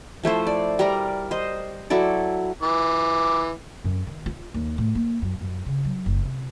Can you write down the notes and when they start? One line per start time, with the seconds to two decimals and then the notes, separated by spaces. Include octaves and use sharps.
0.23 F3 A3 E4 C5
0.47 D5
0.79 G3 A#4 D5 A#5
1.31 C5 D#5
1.90 F#3 E4 A4 D5
2.63 E3 D6
3.84 F#2
4.07 D#3
4.26 F4
4.54 D#2
4.78 A2
4.95 A#3
5.22 F#2
5.41 F#2
5.66 C#3
5.85 F#3
6.06 F#1
6.25 C3